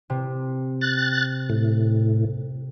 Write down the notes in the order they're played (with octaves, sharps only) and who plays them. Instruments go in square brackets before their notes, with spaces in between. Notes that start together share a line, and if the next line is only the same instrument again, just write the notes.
[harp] C3
[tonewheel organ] F#6 A6
A2